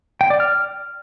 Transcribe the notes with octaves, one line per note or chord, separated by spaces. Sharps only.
G5
D5
F6